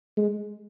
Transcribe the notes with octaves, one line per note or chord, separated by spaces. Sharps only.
G#3